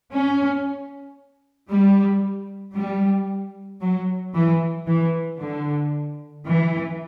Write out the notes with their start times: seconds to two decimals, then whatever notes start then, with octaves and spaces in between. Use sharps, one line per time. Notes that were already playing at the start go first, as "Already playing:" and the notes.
0.11 C#4
1.69 G3
2.75 G3
3.81 F#3
4.34 E3
4.87 E3
5.40 D3
6.45 E3